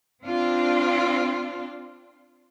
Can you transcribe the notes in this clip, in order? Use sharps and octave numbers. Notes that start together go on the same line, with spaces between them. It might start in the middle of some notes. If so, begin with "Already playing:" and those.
C4 D4 F4